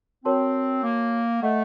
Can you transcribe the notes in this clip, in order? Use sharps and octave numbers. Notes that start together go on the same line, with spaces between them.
C4 F#4 A#4 C#5 A5 C6
A#3
A3 A4 D#5 F#5